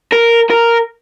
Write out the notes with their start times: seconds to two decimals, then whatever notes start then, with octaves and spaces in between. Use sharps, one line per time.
0.12 A#4
0.50 A#4